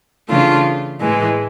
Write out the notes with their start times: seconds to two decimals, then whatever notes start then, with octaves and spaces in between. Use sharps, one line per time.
0.28 C#3 E3 A3 D4 F4
1.01 A2 E3 G#3